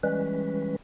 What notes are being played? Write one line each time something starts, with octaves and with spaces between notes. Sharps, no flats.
E3 G3 G#3 C#4 B4